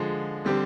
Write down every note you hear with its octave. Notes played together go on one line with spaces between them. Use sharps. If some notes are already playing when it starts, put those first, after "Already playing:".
Already playing: D3 F3 G#3
D3 G3 C4 G4